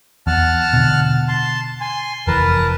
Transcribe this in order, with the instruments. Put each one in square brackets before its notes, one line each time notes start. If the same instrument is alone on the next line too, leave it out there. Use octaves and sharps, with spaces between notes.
[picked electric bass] E2 [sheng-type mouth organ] F#5 A5 F6
[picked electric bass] B2 D3
[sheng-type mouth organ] A5 C6
G#5 C6
[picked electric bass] F1 E3 [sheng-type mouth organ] A#4 B4 A5